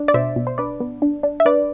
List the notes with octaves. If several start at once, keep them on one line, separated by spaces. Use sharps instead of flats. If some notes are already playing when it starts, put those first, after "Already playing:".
Already playing: D4
D5
B2 C5 E5
B2
C5
D4 B4 D5
B3
D4
D4
E5
D4 B4 D5